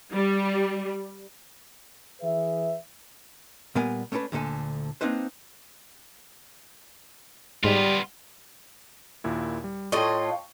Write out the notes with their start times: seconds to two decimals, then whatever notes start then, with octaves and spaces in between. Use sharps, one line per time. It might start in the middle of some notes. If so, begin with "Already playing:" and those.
0.12 G3
2.21 E3 G#4 B4 E5
3.75 A#2 G3 B3 A#4 G#5
4.12 A3 C#4 D4 A4 B4
4.32 D2 A#2 D3 A4 G#5
5.01 A#3 C4 D4 D#4 B4 C5
7.64 G#2 G3 B3 F4
9.24 D#2 A#2 E4
9.64 G3
9.92 A2 F4 D#5 G5 C#6